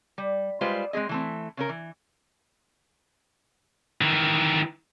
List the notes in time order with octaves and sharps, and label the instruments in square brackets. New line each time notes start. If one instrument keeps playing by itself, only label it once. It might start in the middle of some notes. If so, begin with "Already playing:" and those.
[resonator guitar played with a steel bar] G3
G3 G#3 F4 B4 C5
G#3 C4 G#4 D#5
E3 A3 C4
C#3 C#4 A#4
E3
[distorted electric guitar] D#3 E3